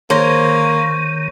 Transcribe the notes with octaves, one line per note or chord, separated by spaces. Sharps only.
D#3 A#3 C5 C#5